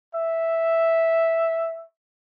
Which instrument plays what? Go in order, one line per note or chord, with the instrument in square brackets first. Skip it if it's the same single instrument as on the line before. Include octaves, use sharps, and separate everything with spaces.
[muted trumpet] E5